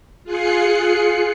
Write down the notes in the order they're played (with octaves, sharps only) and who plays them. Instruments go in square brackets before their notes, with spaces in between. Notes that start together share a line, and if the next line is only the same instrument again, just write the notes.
[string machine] F4 G#4 F#6 C7 C#7